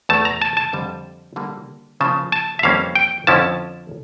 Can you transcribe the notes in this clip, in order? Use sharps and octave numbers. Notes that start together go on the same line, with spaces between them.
E2 E3 A3 A5
A#5
A5
A5
F2 D3 G3
D3 G3 A#3
C#3 F3 A#3 A5
A5
E5
F2 E3 G3 A#3 C#4 F5
G5
F2 D3 F3 C#4 E4 A5